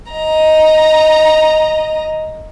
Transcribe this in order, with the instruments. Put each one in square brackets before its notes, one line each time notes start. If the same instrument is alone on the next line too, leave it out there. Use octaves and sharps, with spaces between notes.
[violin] D#5 A#5